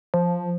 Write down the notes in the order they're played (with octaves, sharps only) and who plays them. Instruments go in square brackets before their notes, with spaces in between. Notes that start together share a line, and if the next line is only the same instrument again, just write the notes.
[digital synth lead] F3